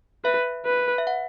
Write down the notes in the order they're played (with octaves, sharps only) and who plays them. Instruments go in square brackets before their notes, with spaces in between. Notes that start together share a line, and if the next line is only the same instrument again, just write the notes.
[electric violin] B4 [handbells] E5
[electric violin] B4
[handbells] E5
F#5